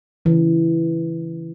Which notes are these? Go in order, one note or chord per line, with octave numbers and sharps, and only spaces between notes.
C#3 E3